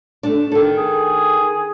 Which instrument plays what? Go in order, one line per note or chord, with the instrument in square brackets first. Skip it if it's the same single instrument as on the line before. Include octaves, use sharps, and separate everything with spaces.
[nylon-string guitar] A3 D4
D#3 A4
[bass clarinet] G#4